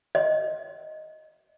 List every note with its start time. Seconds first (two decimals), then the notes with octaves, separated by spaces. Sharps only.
0.15 D#5